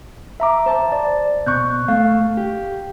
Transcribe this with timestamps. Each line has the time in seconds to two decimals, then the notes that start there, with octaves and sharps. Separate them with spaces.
0.40 E5 A#5 D6
0.66 C5 A5
0.92 D5
1.46 B2 C#6 F#6 G6
1.88 A3 F5
2.37 G4